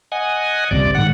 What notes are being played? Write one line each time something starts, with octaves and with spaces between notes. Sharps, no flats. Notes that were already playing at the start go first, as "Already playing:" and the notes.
D#5 F#5 G#5
G1 C#2 G2 C3 D5
G#2 D#3 F#5